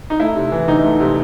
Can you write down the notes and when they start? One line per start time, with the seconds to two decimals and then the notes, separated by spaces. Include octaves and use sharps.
0.10 D#4
0.20 A3 E4
0.35 C3
0.52 E3
0.68 D2 D#4
0.84 A3
1.00 C3